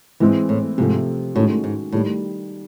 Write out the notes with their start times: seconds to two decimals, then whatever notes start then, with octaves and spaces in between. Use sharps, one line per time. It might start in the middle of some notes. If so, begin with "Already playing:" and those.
0.20 G#2 E3 G#3 C4 E4
0.49 A2
0.78 G#2 C3 F3 A3
1.35 A2 D#3 G#3 C#4 F#4
1.64 G#2
1.92 A2 D#3 G3